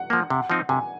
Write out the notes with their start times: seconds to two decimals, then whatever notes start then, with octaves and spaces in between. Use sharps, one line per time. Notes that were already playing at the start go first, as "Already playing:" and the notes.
Already playing: F#5
0.10 F3 A#3
0.30 C3
0.50 F3 C4 D#4
0.69 C3 G#5